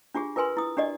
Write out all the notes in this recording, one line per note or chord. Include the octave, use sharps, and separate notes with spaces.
D4 F4 G4 G#4
F4 A#4 B4 G#5 C6
E4 D#6
D4 G4 D5 D#5